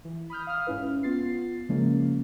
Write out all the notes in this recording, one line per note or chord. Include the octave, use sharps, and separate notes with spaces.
E3
B5 D#6 F6 G6
F5 D#6 F6
G#2 C#4 E4 B4
B3 F4 A6 C7
C#3 F3 G#3 A#3 C#4